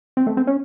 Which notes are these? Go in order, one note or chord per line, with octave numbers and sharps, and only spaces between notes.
C4
A3
C4
C#4